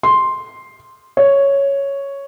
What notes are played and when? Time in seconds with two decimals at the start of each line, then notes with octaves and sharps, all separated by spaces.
0.03 C6
1.17 C#5